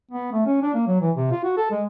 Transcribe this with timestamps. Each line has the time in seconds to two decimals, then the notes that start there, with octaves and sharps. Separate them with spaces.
0.11 B3
0.33 A3
0.46 C#4
0.62 D4
0.74 A#3
0.87 F#3
1.01 E3
1.16 C3
1.31 F4
1.44 F#4
1.57 A4
1.71 G#3